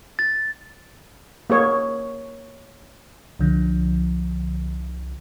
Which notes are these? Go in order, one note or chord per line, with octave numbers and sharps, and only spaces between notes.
A6
A#3 G#4 C#5
C2 D3 F3